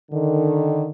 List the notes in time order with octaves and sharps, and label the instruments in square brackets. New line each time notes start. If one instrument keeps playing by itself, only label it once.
[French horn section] D3 D#3